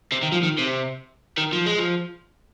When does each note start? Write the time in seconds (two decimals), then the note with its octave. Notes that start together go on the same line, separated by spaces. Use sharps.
0.12 C3
0.22 D#3
0.32 F3
0.43 D#3
0.58 C3
1.38 D#3
1.53 F3
1.66 G#3
1.78 F3